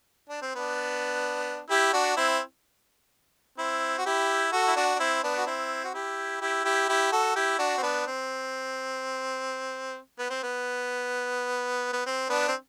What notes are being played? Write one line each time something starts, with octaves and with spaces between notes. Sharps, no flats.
D4
C4
B3 D4
E4 G4
D4 F#4
C4 E4
C4 E4
F#4
E4 G4
F#4 A4
E4
D4 F#4
D4
C4 E4
B3 D4
F#4
C4 E4
F#4
E4 G4
E4 G4
E4 G4
E4 G4
F#4 A4
E4 G4
D4 F#4
C4
B3 D4
C4
B3
C4
B3
B3
C4
B3 D4
C4